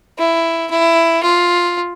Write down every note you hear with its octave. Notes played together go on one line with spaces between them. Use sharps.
E4
E4
F4